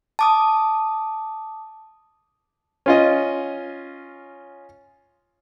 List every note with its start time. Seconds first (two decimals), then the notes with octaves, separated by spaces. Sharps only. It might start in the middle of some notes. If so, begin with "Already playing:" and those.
0.19 A5 D6 D#6
2.86 C#4 F4 D#5